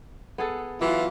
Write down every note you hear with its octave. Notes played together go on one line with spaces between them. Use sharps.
B3 G#4 A4
E3 F#3 F4 F5